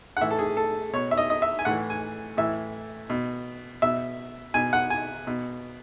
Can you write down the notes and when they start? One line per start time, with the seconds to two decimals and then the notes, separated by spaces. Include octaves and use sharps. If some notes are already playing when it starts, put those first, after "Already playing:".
0.17 F#5
0.21 A2 E3 E5
0.31 A4
0.39 G#4
0.57 A4
0.93 B2 C#5
1.11 E5
1.17 D#5
1.30 D#5
1.42 E5
1.59 G#5
1.65 A2 E3 F#5
1.90 G#5
2.37 A2 E3 E5
3.10 B2
3.82 B2 E5
4.54 B2 G#5
4.73 F#5
4.90 G#5
5.27 B2